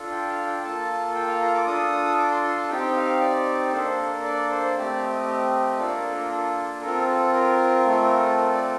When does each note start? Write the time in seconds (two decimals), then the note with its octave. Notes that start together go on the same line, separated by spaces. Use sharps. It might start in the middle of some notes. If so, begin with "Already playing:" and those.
Already playing: D4 F4 A4
0.12 G5
0.30 F5
0.46 G5
0.64 A#3 F4 A4 A5
1.15 G5
1.28 F5
1.41 A#5
1.54 D6
1.66 D4 F4 A4 D#6
2.18 D6
2.31 C6
2.44 C6
2.58 A5
2.69 C4 D#4 G4 G5
2.96 F5
3.21 D5
3.73 A#3 D4 A4 C5
3.98 A#4
4.24 D5
4.51 C5
4.76 A3 C4 G4 D5
5.02 D#5
5.27 D#5
5.79 A#3 D4 F4 A4 D5
5.96 A#4
6.13 A#4
6.31 A4
6.81 C4 F4 A4 A#4
7.08 A4
7.33 A#4
7.85 A3 C4 F4 A4
8.37 A#4
8.54 D5